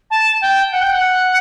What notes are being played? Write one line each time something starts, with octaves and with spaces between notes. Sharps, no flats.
A5
G5
F#5
G5
F#5